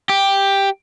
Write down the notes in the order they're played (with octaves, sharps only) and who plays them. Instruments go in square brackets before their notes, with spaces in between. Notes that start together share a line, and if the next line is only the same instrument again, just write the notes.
[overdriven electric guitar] G4